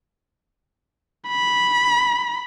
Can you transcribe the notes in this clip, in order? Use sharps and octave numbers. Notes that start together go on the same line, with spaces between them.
B5